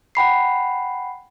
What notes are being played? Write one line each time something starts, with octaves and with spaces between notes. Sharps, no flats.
F#5 G5 B5 C7